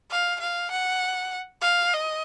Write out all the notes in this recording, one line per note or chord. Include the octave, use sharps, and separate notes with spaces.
F5
F5
F#5
F5
D#5